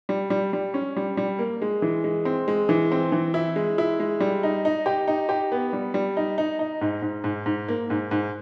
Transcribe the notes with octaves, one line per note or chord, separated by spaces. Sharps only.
G3
G3
G3
C#4
G3
G3
A#3
G#3
E3
G#3
C4
G#3
E3
C4
E3
E4
G#3
E4
G#3
G3
D#4
D#4
G4
D#4
G4
B3
G3
G3
D#4
D#4
D#4
G#2
G#2
G#2
G#2
A#3
G#2
G#2